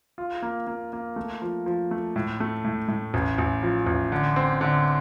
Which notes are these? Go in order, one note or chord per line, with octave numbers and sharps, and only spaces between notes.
F4
A#3
A#3
A#3
A3
F3
F3
A3
A2
A3
A2
A2
A1
A1
F3
A1
D3
C4
D3